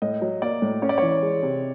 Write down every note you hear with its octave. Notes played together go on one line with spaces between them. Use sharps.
A2 D#5
F#3
A#3 D5
A2
C#4 C#5
D5
E3 C#5
G#3
C3